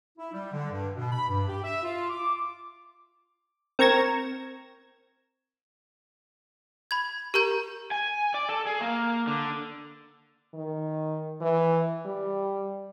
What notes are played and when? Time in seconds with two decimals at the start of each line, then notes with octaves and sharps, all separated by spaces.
0.18 E4
0.33 G3
0.53 D3
0.71 G2
0.95 B2
1.12 B5
1.28 G2
1.48 G4
1.63 E5
1.83 F4
2.09 D6
3.79 C4 A#4 C#6 G#6 A#6 E7
6.91 B5 G#6
7.34 G4 A#4 A#5 G6
7.91 G#5
8.34 D5
8.49 A4
8.67 G#4
8.81 A#3
9.27 D3
10.54 D#3
11.41 E3
12.06 G3